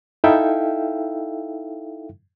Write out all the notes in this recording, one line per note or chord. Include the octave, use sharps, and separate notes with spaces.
D#4 E4 A4 E5 F5 G5